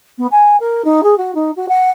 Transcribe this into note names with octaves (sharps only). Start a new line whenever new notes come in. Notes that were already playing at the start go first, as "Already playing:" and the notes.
B3
G#5
A#4
D#4
G#4
F#4
D#4
F#4
F#5